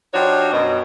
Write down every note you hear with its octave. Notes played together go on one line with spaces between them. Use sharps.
F3 D4 D#4 F#4 G4 C#5
F#2 B2 D#5